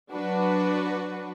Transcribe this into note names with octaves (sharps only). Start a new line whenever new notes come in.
F#3 D4 F#4 B4